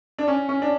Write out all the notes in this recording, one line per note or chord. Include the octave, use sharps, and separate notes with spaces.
D4
C#4
C#4
D4